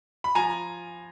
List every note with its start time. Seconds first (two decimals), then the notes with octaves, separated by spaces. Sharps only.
0.24 B5
0.35 F3 G#5 A#5